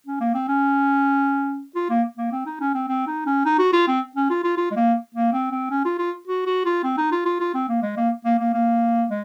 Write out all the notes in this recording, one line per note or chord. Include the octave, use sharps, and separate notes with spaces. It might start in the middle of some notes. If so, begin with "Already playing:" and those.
C#4
A#3
C4
C#4
F4
A#3
A#3
C4
D#4
C#4
C4
C4
D#4
C#4
D#4
F#4
F4
C4
C#4
F4
F4
F4
G#3
A#3
A#3
C4
C4
C#4
F4
F4
F#4
F#4
F4
C4
D#4
F4
F4
F4
C4
A#3
G#3
A#3
A#3
A#3
A#3
G#3